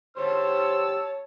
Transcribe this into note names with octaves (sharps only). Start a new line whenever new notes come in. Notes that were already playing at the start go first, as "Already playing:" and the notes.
G#2 D3 G3 C5 C#5 A5 E6